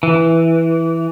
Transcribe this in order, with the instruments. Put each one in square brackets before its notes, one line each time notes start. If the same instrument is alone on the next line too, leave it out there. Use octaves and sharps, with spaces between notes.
[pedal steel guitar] E3